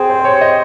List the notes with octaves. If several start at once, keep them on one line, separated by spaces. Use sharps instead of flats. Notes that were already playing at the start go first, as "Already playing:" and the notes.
Already playing: C4 G#4
C5
C5
C#5
D#5